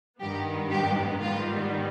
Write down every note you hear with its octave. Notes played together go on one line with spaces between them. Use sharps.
G2 D#3 B3 G4
G4
G#2 D#3 G3 B3 F4